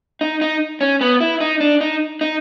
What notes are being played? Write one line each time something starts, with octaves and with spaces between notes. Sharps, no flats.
D#4
D#4
C#4
B3
E4
D#4
D4
D#4
D#4